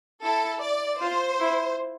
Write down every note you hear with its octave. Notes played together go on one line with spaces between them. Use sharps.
E4 A4
D5
F4 C5
E4